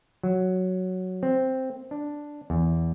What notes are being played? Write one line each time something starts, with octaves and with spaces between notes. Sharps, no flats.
F#3
C4
D4
E2